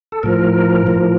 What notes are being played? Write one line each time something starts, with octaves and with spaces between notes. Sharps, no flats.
A4
A2 F3 A#4
A2 F3